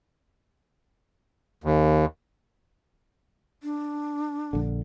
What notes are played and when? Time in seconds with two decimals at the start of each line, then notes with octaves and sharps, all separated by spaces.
1.64 D#2
3.63 D4
4.53 A#1 D3